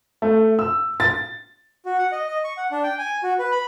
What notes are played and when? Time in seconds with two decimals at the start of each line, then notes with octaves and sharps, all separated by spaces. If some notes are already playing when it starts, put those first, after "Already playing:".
0.22 A3
0.59 E6
1.00 A6
1.86 F#4
1.98 F#5
2.12 D#5
2.28 D#5
2.44 C#6
2.57 F#5
2.72 D4
2.83 G5
2.98 G#5
3.23 F#4
3.39 B4
3.52 B5